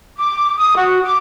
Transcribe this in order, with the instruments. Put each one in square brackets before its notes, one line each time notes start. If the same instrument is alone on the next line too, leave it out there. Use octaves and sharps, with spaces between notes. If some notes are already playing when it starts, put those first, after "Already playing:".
[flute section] D6
D#6
F#4
D6